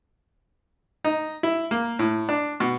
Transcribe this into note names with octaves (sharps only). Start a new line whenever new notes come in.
D#4
E4
A#3
A2
D4
B2